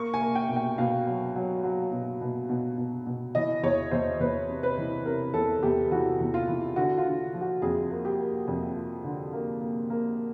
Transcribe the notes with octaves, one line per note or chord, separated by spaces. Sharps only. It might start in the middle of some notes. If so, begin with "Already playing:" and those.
Already playing: A#3 C#6
G#5
A#3
G5
B2
G5
B2 F5
F#3
F#3
F#3
B2
B2
B2
B2
B2
E3 D#5
E2 C#5
E2 C5
E2 B4
C3
B4
E3
C3 A#4
E2 A4
E2 G4
E3 F#4
E2
F4
E3
D3 F#4
F4
D3
F3
F#4
F2 G#4
A#3
G4
A#3
F2
F3
D3
A#3
A#3
A#3